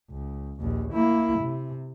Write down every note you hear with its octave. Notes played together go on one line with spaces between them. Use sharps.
C#2
A#1 D#2
A#3 E4
C3